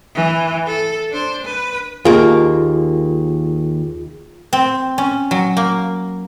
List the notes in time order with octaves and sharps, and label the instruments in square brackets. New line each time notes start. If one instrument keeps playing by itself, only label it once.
[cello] E3
A4
D4 C5
B4
[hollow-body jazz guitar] D#2 A#3 [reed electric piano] F4 G#4
[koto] C4
C#4
F#3
A#3